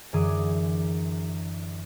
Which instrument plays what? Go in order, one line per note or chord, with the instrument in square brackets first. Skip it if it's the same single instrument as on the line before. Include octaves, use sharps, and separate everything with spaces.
[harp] F#2 D3 E3 G#4 D6 D#6